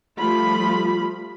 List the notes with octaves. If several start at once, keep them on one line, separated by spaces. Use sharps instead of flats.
F3 G3 A3 F4 B5